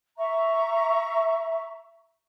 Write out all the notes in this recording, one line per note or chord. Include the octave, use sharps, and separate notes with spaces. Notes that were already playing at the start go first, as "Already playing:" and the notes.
E5 A#5 C#6